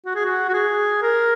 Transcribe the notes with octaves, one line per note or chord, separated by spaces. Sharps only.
F#4
G#4
F#4
F#4
G#4
A#4